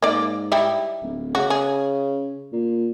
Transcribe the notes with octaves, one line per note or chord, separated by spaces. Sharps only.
G#2 A#3 D5
G3 D#4 E4
D1
C#3 F#4
G#4
A#2